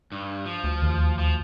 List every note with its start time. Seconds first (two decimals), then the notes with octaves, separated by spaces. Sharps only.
0.12 G2
0.45 F3
0.64 D2
0.82 D#2
1.18 F3